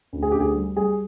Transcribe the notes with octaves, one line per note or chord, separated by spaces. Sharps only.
D2
G#4
D2 G4
G#4
G3
G3 G#4